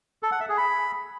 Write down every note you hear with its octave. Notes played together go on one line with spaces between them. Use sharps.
A4
F#5
E5
G#4
B5